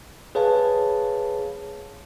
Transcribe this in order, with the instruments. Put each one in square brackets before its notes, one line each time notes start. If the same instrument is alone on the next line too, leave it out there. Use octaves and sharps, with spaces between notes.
[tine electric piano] G#4 B4 C#5 F5 A5